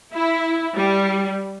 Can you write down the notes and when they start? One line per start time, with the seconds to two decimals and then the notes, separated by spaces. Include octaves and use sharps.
0.13 E4
0.76 G3